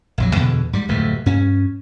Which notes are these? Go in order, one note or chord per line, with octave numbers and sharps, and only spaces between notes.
A#1 F2 F#3
E2 B2 D3
G#2 G3
D1 F2 C3 A3
G2 C#4